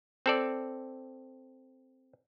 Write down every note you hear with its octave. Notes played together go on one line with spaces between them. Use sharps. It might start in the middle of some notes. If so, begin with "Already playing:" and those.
C4 A4 D5